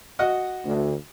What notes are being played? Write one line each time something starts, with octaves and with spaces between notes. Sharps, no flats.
F#4 D#5 F#5
D2